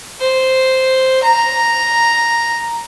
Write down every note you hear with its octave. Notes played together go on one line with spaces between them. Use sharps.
C5
A#5